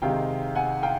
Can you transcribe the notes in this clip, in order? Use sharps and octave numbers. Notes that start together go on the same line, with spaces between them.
C3 D#3 G#3 F5 G5
F#5 G#5
F5 G5